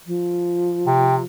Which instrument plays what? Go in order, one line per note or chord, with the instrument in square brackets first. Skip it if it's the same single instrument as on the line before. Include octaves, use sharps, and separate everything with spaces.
[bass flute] F3
[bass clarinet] C3 [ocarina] G5